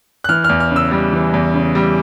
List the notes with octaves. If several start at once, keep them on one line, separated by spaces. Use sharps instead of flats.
F#6
E3 F6
E2 F6
F6
C#3
E6
G3
E3
E2
C#3
G3